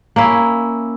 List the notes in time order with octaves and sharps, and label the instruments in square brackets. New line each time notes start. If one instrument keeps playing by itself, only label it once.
[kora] A#3 C#4 E4